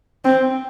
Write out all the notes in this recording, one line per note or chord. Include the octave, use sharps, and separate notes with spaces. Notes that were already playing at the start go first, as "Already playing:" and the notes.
C4